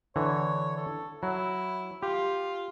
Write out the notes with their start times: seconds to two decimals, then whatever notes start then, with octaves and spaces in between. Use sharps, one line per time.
0.16 D3 E3 C#5
0.77 A4
1.23 F#3 E4
2.03 F4 G4